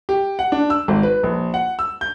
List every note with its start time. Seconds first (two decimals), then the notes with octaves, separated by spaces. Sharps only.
0.09 G4
0.39 F#5
0.52 D4
0.70 E6
0.88 G#1
1.03 B4
1.23 A#1
1.54 F#5
1.79 E6
2.01 G6